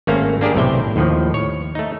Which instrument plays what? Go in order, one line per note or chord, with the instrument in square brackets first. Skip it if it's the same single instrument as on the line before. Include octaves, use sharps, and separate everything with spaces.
[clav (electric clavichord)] G#1 A3 A#3 C#4 F5 A#5
A#3 D4 G4 G#4 A#4
B1 A2 C3 E5 G5
D#2 A2 D#3 F3
C#5
A3 D#4